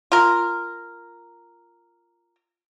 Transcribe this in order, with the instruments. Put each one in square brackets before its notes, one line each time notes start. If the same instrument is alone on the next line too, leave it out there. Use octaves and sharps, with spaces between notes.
[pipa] F4 A#4